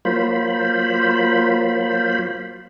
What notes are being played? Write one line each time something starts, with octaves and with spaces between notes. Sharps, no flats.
F#3 A#3 F4 C5 B5